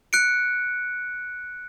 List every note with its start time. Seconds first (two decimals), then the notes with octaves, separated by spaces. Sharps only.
0.13 F#6 C#7 D7